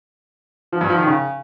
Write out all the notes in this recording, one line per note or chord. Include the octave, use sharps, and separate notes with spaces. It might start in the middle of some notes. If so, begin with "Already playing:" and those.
F3
G2
F3
D#3
C#3